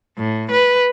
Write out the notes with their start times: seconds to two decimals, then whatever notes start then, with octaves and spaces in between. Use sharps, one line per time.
0.18 A2
0.51 B4